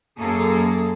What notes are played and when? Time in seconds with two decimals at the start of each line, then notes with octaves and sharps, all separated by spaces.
0.20 F#2 A#3 G#4 A4